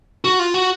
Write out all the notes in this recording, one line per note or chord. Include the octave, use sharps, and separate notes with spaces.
F#4
F4
F#4